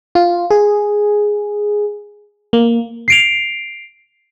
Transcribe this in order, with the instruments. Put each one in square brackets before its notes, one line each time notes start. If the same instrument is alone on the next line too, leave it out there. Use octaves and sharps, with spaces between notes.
[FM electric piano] F4
G#4
A#3
[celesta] C7 D7 F7